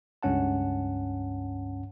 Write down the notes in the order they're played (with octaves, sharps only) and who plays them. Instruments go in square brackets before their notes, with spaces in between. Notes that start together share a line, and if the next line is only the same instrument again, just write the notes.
[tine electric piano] C#2 G2 C#4 F#5 A5